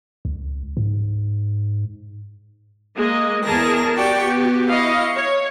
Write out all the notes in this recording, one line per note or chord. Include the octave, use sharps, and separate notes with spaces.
C#2
G#2
G#3 A#3 D#5
E2 G#4 A#4 A5 A#6
F#4 G4 D5 G5 C#6
B3
E4 D#5 F5 C#6
C#5